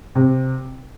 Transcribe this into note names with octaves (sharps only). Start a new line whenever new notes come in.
C3